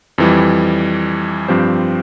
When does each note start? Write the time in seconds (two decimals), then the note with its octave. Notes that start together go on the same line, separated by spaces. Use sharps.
0.18 F2 E3 G3
1.48 G2 F3 C4 G4 C5